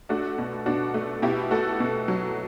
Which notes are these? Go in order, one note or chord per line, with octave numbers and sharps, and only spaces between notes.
A3 D4 F#4
B2
B2 D4 F#4
A3
B2 E4 G4
A3 F#4 A4
B2
F#3